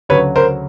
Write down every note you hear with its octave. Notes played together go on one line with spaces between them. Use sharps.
D2 C#3 F#3 B4 C#5
A#4 C5